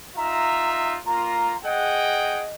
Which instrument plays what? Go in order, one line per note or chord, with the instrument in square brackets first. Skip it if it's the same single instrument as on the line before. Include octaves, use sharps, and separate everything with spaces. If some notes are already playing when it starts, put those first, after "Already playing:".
[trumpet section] D#4 F4 E5 [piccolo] A#5
[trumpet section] A#3 F4 [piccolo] A#5
[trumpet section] G#4 F#5 G5 [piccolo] D#5